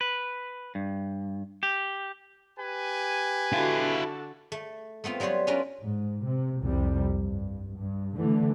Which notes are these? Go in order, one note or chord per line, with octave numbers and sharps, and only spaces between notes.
B4
G2
G4
G4 B4 G#5
D3 E4 F#4 F5 A5
A3
A3 B3 C4 F4
F#3 G3 B3 C5 C#5
C#4 D4 F4 A#4 B4
G#2
C3
C2 F2 C3 G3
G2
G2
D3 E3 A3